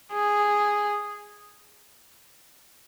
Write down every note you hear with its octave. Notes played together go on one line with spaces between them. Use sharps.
G#4